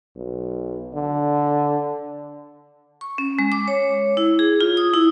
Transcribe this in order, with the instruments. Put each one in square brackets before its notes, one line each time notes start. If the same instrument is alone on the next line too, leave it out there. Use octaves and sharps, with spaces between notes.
[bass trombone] B1
D3
[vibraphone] C#6
C#4
G#3
D6
C#5
E4
G#4
F4
D#6
E4